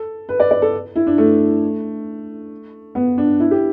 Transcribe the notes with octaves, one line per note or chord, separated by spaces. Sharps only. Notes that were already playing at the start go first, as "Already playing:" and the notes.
Already playing: A4
B4
D5
D5
A4
E4
D4
A3
B3
D4
E4
G4